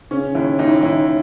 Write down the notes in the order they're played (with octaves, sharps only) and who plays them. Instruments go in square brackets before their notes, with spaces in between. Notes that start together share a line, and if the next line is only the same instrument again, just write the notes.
[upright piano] C#3 C#4
D#2 E4
D#2 D#4
E4
D#4
D#2 E4